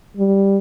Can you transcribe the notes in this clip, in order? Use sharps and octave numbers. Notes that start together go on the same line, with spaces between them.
G3